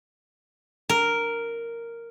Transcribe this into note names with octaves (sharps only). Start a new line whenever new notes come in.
A#4